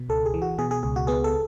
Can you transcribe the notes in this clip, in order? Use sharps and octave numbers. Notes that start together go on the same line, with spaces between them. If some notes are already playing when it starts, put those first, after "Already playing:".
Already playing: B2
C#2 A4
G#4
E3
F#4
B2 G#4
G#4
C#2 G#4
F#4
B3 G#4
A4